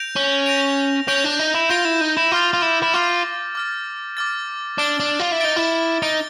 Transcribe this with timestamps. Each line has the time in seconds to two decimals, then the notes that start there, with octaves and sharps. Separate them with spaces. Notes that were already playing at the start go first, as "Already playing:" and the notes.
Already playing: G6 A#6 D7 F7
0.16 C#4
0.46 G6 A#6 D7 F7
1.08 C#4 G6 A#6 D7 F7
1.24 D4
1.39 D#4
1.55 E4
1.69 F4 G6 A#6 D7 F7
1.85 E4
2.01 D#4
2.17 E4
2.32 F4 D6 F6 A6
2.53 F4
2.62 E4
2.82 E4
2.93 F4 D6 F6 A6
3.55 D6 F6 A6
4.17 D6 F6 A6
4.78 D4 A6 D7 G7
5.00 D4
5.20 F4
5.32 E4
5.40 D#4 A6 D7 G7
5.56 E4
6.02 D#4 A6 D7 G7